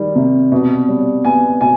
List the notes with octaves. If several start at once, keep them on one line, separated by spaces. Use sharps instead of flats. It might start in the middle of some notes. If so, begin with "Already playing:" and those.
Already playing: D#3 G3
C3
B2
G3
B3 G#5
B2 G#5